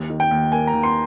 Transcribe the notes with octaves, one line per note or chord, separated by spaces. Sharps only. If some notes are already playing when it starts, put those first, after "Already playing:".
Already playing: D#2
D#3
G5
D#2
A#3 G#5
A#5
D#2
C6